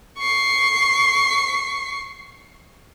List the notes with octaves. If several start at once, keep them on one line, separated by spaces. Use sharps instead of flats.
C#6 C7